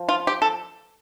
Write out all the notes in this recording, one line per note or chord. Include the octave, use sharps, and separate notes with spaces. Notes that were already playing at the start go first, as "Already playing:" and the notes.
Already playing: F3
F4
G4
A4